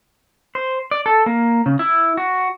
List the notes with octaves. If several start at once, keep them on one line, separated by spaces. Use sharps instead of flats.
C5
D5
A4
A#3
C#3
E4
F#4